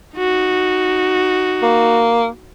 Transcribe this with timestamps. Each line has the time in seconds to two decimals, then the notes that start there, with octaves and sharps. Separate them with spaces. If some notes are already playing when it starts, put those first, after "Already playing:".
0.18 D#4 F#4
1.62 A#3